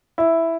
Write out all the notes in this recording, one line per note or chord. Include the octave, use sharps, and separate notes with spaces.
E4